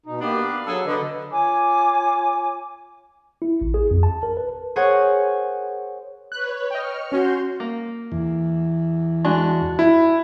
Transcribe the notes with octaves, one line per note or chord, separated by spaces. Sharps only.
B2 D#4
A#3 B3 D4 G4
F5
F#3 D4 G#4 A4
D3 B4 D#5
F4 C#5 G#5 D6
E4
A1
G#4
F2
A5
A#4
B4
G#4 A#4 C5 C#5 F#5 G#5
B4 C#5 F#6
D#5 G5 C#6 F6
C#4 F#4 C6 G6
A#3
E2
G#3 D4 F#4
E4